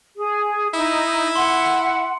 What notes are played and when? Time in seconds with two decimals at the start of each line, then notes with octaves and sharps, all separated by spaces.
0.16 G#4
0.74 D#4 E4
1.36 F#5 C6